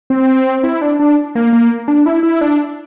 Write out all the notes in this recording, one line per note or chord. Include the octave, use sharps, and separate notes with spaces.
C4
E4
D4
D4
A#3
A#3
D4
E4
E4
D4